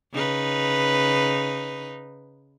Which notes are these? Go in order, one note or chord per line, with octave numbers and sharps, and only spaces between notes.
C#3 D#4 B4